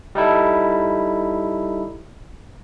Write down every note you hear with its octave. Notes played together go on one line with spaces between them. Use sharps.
G3 D#4 E4 A4